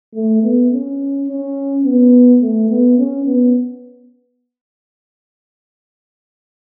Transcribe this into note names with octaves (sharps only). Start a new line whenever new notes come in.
A3
B3
C#4
C#4
B3
A3
B3
C#4
B3